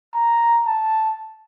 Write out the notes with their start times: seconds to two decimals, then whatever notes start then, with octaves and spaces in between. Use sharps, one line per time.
0.14 A#5
0.65 A5